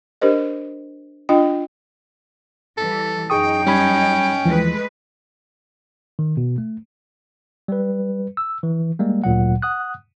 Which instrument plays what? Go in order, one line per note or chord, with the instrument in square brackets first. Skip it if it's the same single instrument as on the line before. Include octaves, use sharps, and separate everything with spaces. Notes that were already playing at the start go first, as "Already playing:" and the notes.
[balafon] D4 G4 A#4 C5 D#5
D4 F4 D#5 G5
[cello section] E3 G3 [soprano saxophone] A4
[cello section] F#2 D#4 [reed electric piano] G#4 C#6 D#6 [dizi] G5
[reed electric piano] G3 B5 G#6 [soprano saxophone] C#4
[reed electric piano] D#2 E3 F3 [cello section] G#3 A3 B4
[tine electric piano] D#3
B2
A3
G3 B4
E6
E3
G3 G#3 A#3
D2 A#2 F#3 F#5
F#5 D#6 F#6